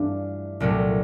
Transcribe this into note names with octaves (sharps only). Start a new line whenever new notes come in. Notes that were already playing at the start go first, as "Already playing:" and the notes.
Already playing: G2 E3 A3 D4 F4
C2 A#2 F#3 A3